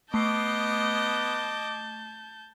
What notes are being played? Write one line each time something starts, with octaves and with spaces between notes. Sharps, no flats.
A3 B3 D#5 A5 C#6 D6 G6 C7